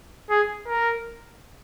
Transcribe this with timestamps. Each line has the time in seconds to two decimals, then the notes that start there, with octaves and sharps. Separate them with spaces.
0.30 G#4
0.68 A#4